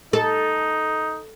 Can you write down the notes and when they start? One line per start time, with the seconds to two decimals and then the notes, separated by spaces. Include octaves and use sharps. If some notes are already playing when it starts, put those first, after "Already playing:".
0.13 D#4 A4